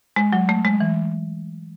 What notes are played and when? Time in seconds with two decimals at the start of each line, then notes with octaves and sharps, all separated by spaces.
0.16 G#3
0.33 F#3
0.49 A3
0.65 G#3
0.80 E3